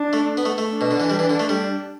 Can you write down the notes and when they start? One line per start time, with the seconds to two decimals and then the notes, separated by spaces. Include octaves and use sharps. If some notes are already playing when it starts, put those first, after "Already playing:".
Already playing: D4
0.13 A3
0.37 B3
0.45 A3
0.58 A3
0.71 D4
0.81 B2
0.91 D3
1.00 E3
1.10 G3
1.19 E3
1.29 D3
1.40 A3
1.49 G3